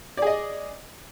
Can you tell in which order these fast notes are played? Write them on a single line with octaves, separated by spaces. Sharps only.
D5 G#4 D#5